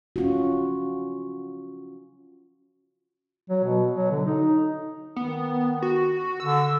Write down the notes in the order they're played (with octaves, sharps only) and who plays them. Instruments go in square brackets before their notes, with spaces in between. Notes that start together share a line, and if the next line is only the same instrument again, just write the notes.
[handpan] C#4 F4 F#4
[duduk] F#3
B2
F#3
D3
D#4
[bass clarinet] D#3 [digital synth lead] B3
[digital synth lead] F#4
[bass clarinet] D3 [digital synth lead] E6